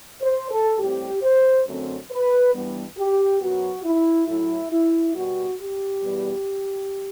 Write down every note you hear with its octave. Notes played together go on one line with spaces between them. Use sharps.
C5
A4
A2 G3 C4 G4
C5
F#2 D3 A3 C4
B4
G2 E3 G3 B3
G4
F#2 F#3 B3 F#4
E4
A2 F#3 A3 E4
E4
B2 G3 B3 F#4
G4
E2 B2 G3 B3